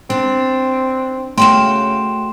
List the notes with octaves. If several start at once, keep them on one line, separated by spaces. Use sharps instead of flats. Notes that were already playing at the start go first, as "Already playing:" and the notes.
C4 D4
C#3 A3 F#4 F5 G5 C6 E7